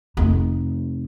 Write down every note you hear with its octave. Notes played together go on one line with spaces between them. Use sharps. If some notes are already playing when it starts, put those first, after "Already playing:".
F1 D#4